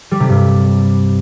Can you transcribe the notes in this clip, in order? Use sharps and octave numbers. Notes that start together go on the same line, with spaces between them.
G3
C3
G2